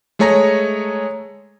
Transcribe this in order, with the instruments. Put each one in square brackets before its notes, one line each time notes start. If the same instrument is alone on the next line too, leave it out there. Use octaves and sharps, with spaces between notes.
[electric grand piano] G#3 A3 G#4 C#5 A#5 A#6